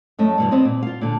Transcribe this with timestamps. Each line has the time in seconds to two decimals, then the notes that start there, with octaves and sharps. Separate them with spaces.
0.19 F#2 A3 D#5
0.38 G2 B2 E3
0.51 B3 C4 C5 D5 D#5
0.65 A#2
0.83 F4 F5
1.01 A#2 D3